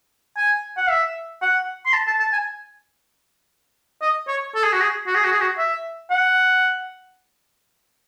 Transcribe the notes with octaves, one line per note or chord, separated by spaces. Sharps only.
G#5
F#5
E5
F#5
C6
A5
A5
A5
G#5
D#5
C#5
A4
G#4
F#4
G#4
F#4
G#4
F#4
G#4
F#4
E5
F#5